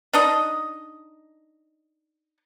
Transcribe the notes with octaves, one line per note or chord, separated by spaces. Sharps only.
D4 D#4 D#5